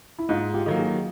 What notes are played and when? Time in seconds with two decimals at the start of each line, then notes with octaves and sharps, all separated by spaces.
0.19 E4
0.29 G#2 D#4 F4
0.54 F4 G4
0.66 D#3 F#3 A#3
0.79 F#4 G#4